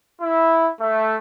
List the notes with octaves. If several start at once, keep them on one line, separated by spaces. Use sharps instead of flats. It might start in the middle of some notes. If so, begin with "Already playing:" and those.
E4
A3